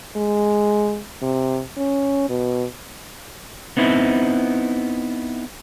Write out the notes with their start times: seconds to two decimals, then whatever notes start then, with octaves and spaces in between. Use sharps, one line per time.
0.16 G#3
1.22 C3
1.77 C#4
2.29 B2
3.77 B3 C4 D#4 E4